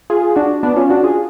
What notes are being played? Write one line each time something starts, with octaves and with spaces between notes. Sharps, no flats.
F4 G#4
D4 F#4
B3 D4
C#4 F4
D4 F#4
F4 G#4